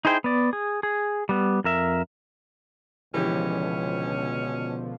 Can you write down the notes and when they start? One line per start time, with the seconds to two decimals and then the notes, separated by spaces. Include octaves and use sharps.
0.05 D#4 E4 G#4 C5 F#5 G5
0.24 B3 D5
0.53 G#4
0.83 G#4
1.29 G3 B3
1.64 F2 A#4 E5
3.14 C#2 B2 D3 E3 F3 C#4 G4